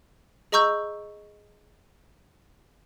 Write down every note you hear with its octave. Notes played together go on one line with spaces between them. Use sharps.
G#4 D#5 A#5 C#6 E6 G6